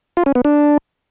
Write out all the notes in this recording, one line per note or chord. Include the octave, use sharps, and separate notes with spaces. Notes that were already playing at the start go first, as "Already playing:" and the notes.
F4
C#4
B3
D4